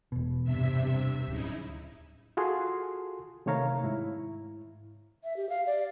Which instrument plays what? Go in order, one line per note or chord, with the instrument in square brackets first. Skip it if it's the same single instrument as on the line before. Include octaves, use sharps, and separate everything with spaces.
[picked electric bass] E1 B2
[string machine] G2 C3 E5
[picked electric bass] D1 [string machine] C#3 D#4 E4
[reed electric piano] F4 F#4 G#4 A4 C6
C3 D#3 A3 C#5 F5 A#5
G#2 E4
[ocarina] E5
G4
F5
D5